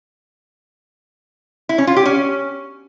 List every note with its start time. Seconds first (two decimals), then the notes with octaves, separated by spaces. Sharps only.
1.69 E4
1.78 C#4
1.87 F4
1.96 G4
2.06 C#4